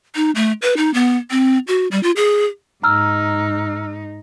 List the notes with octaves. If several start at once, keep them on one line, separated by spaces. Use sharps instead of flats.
D#4
A3
B4
D#4
B3
C4
F#4
G3
F4
G#4
G#2 D#4 A#5 E6 F6